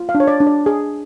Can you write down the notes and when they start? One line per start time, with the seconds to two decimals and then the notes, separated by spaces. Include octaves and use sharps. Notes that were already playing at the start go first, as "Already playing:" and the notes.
Already playing: F4
0.09 F5
0.15 D4
0.20 C#5
0.28 D5
0.40 D4
0.47 D5
0.66 G#4